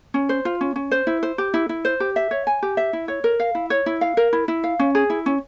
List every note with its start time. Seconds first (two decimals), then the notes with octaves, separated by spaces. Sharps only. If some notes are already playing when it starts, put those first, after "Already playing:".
0.14 C#4
0.29 C5
0.45 F4
0.61 C#4
0.76 C#4
0.91 C5
1.07 E4
1.23 C5
1.38 G4
1.54 E4
1.69 E4
1.85 C5
2.00 G4
2.16 E5
2.31 C#5
2.47 G#5
2.63 G4
2.77 E5
2.93 E4
3.08 C#5
3.24 A#4
3.40 F5
3.55 E4
3.70 C#5
3.86 E4
4.01 F5
4.17 A#4
4.33 E4
4.48 E4
4.64 F5
4.79 C#4
4.95 G#4
5.10 E4
5.26 C#4